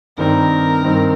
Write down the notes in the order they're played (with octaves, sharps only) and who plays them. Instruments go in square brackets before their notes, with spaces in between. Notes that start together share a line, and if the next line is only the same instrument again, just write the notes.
[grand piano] G2 D#3 G3 C4 D#4 [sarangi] A#4
[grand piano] G2 D#3 G3 C4 D#4